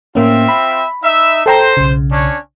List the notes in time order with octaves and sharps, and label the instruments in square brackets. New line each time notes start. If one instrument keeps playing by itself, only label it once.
[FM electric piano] A2 A#3 C#4 [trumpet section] C4 F4 E5
[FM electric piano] B5
[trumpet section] D#4 E5
[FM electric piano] A4 G5 A#5 [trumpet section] C5
[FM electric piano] B1 C#3
[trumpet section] C#4 D4 C#5